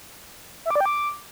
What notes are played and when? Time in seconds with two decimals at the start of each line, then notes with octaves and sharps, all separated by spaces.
0.65 E5
0.70 D6
0.75 D5
0.81 G5
0.86 D6